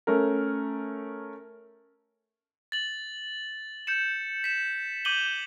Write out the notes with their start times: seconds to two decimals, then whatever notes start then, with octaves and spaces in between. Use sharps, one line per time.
0.07 A3 C#4 A#4
2.72 A6 F#7
3.87 G6 C#7 E7
4.44 B6 E7
5.05 D6 G6 D#7 F#7 G7